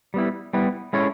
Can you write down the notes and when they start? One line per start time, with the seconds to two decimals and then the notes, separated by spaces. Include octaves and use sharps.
0.14 G3 B3 E4
0.53 G3 B3 E4
0.93 G#3 C#4 E4 A4 C#5